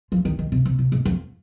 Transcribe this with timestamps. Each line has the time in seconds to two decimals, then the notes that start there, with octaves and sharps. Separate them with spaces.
0.12 F3
0.25 D#3
0.39 D#3
0.52 C3
0.65 C3
0.79 C3
0.92 G#2
1.05 F2